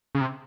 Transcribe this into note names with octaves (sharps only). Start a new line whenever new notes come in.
C#3
C3